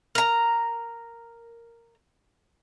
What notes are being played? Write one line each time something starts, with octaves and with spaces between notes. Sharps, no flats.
A#4 A#5